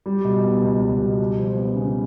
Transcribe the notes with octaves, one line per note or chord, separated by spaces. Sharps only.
G3
B2
B3
C#2
G3
B2
G#3
F3
B3
C#3